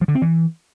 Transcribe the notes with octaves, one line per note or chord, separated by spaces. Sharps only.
F3
D3
C4
E3